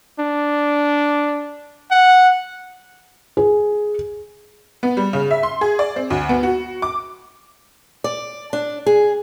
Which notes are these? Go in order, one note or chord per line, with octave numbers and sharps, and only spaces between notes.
D4
F#5
G#4
B3
G3
C#3
E5
C6
G#4
D5
C4
D2
B3
F#4
D6
D5
D4
G#4